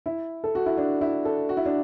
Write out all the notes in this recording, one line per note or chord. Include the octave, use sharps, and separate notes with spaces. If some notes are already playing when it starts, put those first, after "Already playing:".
E4
A4
F#4
E4
D4
E4
A4
F#4
E4
D4